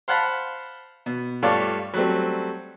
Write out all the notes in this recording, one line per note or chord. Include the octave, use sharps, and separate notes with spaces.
C5 F5 F#5 A5 B5
B2
G2 A3 F4 C#5 D5 A5
F#3 G3 A3 C4